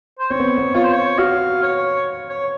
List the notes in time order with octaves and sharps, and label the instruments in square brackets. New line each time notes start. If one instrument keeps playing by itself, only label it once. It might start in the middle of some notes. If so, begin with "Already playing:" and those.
[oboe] C5
[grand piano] C4 [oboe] C#5
[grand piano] B3
B3
[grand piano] F4 [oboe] C#5
[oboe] C5
C#5
[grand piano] F#4 [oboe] F5
[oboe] C#5
C#5